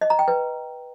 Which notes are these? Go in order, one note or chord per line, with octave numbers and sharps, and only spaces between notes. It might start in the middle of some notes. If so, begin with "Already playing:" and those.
D#5
A#5
G5
B4